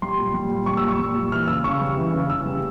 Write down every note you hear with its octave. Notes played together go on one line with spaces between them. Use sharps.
G3 C6
A#2
G3
A#2
G3 C#6
E6
A#2
C#6
G3
A#2
E3 F6
C#3 E6
C#3 C#6
G3
E3
C#3
C#3 E6
G3